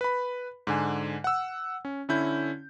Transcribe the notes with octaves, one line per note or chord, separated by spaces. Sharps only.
B4 B5
G#2 D3 G#5
F#5 E6
C#4
D3 C#4 E4 G6